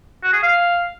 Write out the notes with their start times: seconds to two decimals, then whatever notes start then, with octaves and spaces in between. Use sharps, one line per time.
0.23 F#4
0.33 G#4
0.43 F5